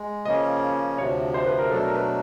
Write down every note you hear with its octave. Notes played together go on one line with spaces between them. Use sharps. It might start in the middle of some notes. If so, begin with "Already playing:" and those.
Already playing: G#3
C#3 F3 A#3 C#4 D#5
D2 C3 F3 C#5
C5
B4
A#4
B2 F#3 A3 D4 A4
A#4
B4